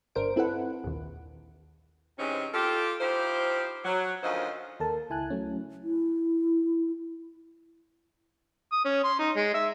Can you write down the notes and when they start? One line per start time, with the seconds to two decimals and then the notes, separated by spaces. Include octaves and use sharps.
0.15 G1 D4 A#4 C5 D7
0.36 C4 E4 A4 B4 F#5
0.84 A#1 D#2
2.19 C3 E3 G#3 C4 C#4 D#4
2.54 F4 G4 A4
3.00 F3 D#4 E4 G4 C5 F5
3.85 F#3
4.23 D2 D#3 F3 C#4 C5 D#5
4.80 D#2 A4 A#4 A5
5.10 C#2 E4 G#5 A5 F#6
5.30 F#3 A3 C#4
5.83 E4
8.72 D#6
8.85 C#4
9.04 C6
9.19 D#4
9.36 G#3
9.54 E5